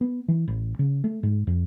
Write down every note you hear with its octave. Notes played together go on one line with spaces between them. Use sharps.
B3
E3
A1
C#3
A3
G#2
F2